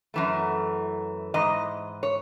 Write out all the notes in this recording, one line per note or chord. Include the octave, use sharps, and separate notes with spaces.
F#2 E3 A3
G#2 E3 D#5
C#5